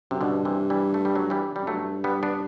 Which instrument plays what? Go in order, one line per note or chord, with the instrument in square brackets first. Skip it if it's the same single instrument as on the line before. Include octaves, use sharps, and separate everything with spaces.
[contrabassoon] F#2 [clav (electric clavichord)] C3
[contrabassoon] G2 [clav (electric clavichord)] B2 D3
[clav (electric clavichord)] C3 E3
E3 G3
A3
G3
F#3 A3
E3 G3
G3
[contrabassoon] F#2
[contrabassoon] G2 [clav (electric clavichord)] F#3 A3
[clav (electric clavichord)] G3 B3
B3 D4